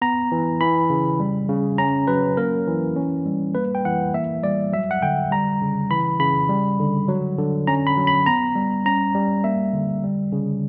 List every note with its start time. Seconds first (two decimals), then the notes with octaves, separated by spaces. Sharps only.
0.02 B3 A#5
0.32 E3
0.61 E3 B5
0.90 C#3
1.20 G3
1.49 C#3
1.78 C#4 A#5
2.07 F#3 B4
2.37 A#3 A#4
2.67 E3
2.96 C#4
3.26 G3
3.55 A#3 B4
3.75 G5
3.85 E3 F#5
4.14 A#3 E5
4.43 G3 D5
4.72 F#3 E5
4.91 F#5
5.02 D3 G5
5.31 G3 A#5
5.61 C#3
5.91 E3 B5
6.20 C#3 B5
6.49 G3
6.79 D3
7.08 F#3
7.38 D3
7.67 C#4 A#5
7.87 B5
7.97 F#3
8.07 B5
8.26 B3 A#5
8.55 G3
8.85 C#4 A#5
9.15 G3
9.44 A#3 E5
9.73 D3
10.03 G3
10.32 C#3